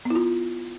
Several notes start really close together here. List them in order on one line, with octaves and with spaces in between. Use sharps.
B3 E4 F4